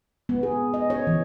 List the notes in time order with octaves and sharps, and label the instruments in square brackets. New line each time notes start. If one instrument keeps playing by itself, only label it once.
[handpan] B3
G#4
D#5
C#5
E3